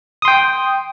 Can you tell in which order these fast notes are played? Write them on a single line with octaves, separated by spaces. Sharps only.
D#6 C6 G5